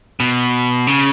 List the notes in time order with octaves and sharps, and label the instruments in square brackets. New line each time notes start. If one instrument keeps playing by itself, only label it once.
[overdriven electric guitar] B2
C#3